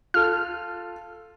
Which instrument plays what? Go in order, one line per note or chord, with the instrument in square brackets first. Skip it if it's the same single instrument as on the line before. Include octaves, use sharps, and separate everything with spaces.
[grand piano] F4 A4 [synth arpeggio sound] F6